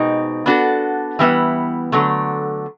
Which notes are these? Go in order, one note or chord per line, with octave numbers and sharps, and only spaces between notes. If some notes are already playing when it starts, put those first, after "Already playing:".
Already playing: B2 G#3 C4 D#4 G4
B3 D4 F#4 A4
E3 G3 B3 E4
D3 F#3 A3